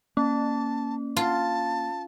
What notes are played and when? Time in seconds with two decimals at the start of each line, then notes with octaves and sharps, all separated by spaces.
0.17 A#3 C#4 A5
1.17 F4 A5